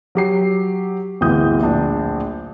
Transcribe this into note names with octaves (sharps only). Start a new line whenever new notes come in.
F#3 G4 C7
D1 G1 E3 D#6 G6
D1 A#1 D4